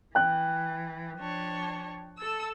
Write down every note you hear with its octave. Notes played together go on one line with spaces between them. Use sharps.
E3 G5 F#6
F3 D4 C#5
A4 A5 E6